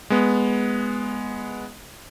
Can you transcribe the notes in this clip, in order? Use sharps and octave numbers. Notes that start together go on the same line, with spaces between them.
G#3 B3